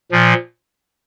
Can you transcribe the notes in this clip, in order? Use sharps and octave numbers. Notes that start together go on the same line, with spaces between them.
A#2 F3